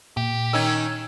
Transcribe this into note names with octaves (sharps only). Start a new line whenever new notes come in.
A#2 G4
D#3 C#4 D#4 E6 G#6